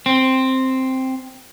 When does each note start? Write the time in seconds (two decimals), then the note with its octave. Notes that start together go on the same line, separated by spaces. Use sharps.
0.06 C4